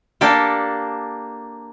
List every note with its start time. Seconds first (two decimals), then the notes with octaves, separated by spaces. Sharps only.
0.21 A#3 D4 G4 A4